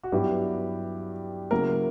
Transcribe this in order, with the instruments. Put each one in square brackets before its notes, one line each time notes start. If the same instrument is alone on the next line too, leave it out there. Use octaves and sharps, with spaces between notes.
[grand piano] F#4
G2 F#3 B3 E4 G4
C#3 F#3 A#3 E4 A#4